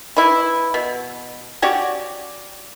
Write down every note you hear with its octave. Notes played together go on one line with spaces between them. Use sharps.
E3 E4
B2
C#4 F#4 G4 D5